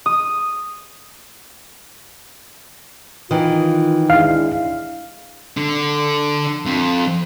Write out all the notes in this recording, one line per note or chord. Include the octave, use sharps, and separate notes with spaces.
D#6
D#3 E3 F4
G#3 D4 E4 F5
D3
F2